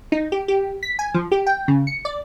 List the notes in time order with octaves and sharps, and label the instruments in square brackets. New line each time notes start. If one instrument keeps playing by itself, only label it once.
[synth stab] D#4
G4
G4
B6
G#5
F3
G4
G5
C#3
C#7
D5